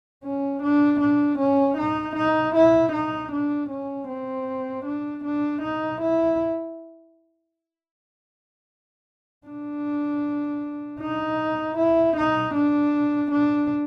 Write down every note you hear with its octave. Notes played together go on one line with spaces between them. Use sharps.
C#4
D4
D4
C#4
D#4
D#4
E4
D#4
D4
C#4
C4
D4
D4
D#4
E4
D4
D#4
E4
D#4
D4
D4